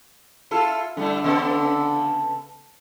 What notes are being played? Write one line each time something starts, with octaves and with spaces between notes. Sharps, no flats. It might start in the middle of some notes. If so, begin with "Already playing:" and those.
E4 F4 A4
D3 G3 A3 E4
C#3 B3 A4